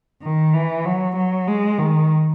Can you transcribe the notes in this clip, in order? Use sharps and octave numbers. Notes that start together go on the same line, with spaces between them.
D#3
E3
F#3
F#3
G#3
D#3